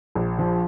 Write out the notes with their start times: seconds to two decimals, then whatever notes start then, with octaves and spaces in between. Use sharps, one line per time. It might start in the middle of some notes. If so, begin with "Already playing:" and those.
0.15 A#1
0.38 F3